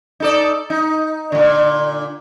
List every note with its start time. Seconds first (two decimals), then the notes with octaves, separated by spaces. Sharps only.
0.20 D#4 A4 D5
0.70 D#4
1.32 A#2 D3